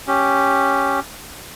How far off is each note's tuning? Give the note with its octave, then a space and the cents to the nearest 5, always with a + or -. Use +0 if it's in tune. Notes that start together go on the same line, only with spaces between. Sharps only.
C#4 +0 G4 +0